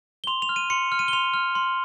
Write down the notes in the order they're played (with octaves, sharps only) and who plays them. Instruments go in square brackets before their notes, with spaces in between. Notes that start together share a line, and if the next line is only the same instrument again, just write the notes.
[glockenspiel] G7
C6 F7
F7
F6
D#7
C6 C#7
F6
D#7
G7
C6 F7
F6
C6